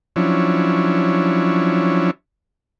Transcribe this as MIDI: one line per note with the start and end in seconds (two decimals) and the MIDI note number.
0.16 2.11 53
0.16 2.11 54
0.16 2.11 61
0.16 2.11 62
0.16 2.11 64